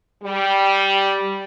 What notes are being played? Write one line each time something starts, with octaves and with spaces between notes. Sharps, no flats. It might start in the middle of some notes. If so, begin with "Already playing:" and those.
G3